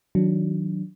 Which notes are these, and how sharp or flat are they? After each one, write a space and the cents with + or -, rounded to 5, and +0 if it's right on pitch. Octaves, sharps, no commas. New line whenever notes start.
D#3 +25 F#3 +0 D4 +0